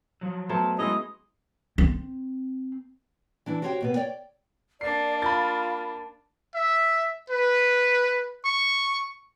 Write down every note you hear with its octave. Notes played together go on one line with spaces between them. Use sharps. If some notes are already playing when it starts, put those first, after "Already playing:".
F3 F#3
F#3 A3 B3 C5 A5
F#3 G#3 C#4 E4 G#4 D#5
C4
E3 D4 E4
F#4 G4 C5 C#5 F5 G5
D#2 B2 B3
C#5 D5 G5
A#3 D4 D5 C7
F4 B5 A6
E5
B4
C#6